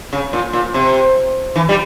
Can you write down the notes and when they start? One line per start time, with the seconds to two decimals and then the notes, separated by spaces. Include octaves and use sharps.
0.13 C#3
0.33 A#2
0.53 A#2
0.74 C3
1.56 E3
1.69 G3